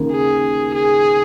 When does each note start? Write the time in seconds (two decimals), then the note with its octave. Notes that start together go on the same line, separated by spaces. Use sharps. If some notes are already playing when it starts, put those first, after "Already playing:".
Already playing: D#2 C#3 A#3
0.12 G#4
0.74 G#4